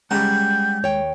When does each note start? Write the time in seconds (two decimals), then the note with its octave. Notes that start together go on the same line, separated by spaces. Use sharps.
0.11 G3 G#3 C#4 F#5 A#5 G6
0.83 D#2 C#5 G5